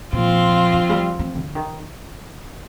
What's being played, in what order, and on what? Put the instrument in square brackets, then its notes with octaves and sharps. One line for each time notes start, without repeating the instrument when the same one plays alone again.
[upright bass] A#2 [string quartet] F3 C4 F4
[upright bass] D3
G3
C4
D3
D#3